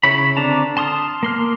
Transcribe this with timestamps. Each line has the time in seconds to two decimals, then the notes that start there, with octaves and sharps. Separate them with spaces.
0.03 C#3 E4 C#5 B5
0.37 D3 C4 D4 A5 A#5
0.77 A5 C6 D#6 F6
1.23 A#3 C6 F6